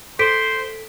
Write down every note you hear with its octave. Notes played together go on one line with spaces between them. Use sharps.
A4 C5 C6 B6 D7